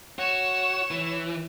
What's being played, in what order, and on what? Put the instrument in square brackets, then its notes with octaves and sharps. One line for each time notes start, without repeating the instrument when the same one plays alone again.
[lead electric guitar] F#4 [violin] C#5 E7
[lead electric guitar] E3